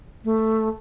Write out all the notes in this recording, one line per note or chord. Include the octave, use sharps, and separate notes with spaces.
A3